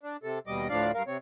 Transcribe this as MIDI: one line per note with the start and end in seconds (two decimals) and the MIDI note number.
0.03 0.17 62
0.23 0.39 48
0.23 0.39 69
0.47 0.68 39
0.47 0.68 47
0.47 0.68 55
0.47 0.68 75
0.47 0.68 86
0.69 0.91 38
0.69 0.91 45
0.69 0.91 53
0.69 0.91 62
0.69 0.91 74
0.69 0.91 77
0.94 1.03 43
0.94 1.03 70
0.94 1.03 77
1.07 1.17 48
1.07 1.17 60
1.07 1.17 73